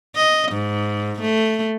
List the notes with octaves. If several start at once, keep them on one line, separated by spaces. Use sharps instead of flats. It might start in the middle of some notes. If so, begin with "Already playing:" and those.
D#5
G#2
A3